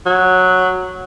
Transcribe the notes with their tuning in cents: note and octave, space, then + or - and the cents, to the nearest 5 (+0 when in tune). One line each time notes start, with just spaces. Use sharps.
F#3 -5